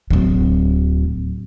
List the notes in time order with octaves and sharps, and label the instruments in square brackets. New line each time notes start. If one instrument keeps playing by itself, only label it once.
[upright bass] D1 F#3